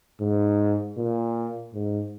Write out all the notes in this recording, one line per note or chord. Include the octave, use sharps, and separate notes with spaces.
G#2
A#2
G#2